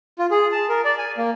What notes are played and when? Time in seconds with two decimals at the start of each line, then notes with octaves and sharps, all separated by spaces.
0.19 F4
0.31 G#4
0.52 A5
0.69 A#4
0.85 D5
0.98 G#5
1.17 A#3